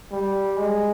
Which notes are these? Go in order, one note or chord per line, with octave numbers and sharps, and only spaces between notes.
G3
G#3